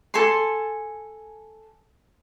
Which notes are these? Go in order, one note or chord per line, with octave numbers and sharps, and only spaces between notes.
A4 G#5 C6